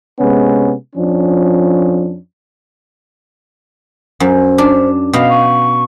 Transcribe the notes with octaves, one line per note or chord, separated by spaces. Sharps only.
C3 G#3 B3 C#4
F2 F3 C#4 D4
F#2 C5
D4
B2 F5
C#6